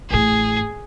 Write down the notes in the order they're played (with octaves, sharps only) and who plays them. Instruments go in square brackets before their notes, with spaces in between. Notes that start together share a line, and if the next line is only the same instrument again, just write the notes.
[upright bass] A1 A2 [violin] G#4